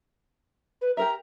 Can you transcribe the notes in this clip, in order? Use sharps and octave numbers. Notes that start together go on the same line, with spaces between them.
B4
G4 A#4 E5 A#5